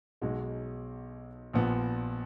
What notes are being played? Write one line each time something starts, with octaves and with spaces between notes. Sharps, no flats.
B1 B2 G#3 D#4 F#4
A#1 A#2 F3 B3